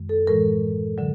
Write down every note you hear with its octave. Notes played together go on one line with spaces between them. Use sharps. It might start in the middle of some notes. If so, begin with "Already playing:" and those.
Already playing: F#2 D#3 G#3
A4
A2 E3 G#3 A#4
D3 F#3